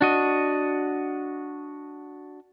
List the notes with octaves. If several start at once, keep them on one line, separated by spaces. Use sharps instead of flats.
D4 F#4 D#5